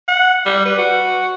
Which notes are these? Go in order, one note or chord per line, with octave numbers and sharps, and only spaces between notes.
F#5
G3
B4
F#4